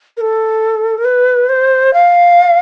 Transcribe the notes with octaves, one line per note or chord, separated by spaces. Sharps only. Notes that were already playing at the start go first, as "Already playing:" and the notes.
A#4
A4
A#4
B4
C5
F5